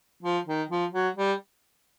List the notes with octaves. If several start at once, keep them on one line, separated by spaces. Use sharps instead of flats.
F3
D#3
F3
F#3
G3